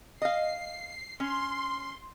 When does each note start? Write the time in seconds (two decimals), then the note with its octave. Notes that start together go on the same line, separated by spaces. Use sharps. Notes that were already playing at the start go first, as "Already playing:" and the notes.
0.22 D#5 F5 C7
1.20 C#4 C6